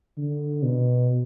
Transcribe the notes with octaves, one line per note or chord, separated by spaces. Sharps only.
D3
B2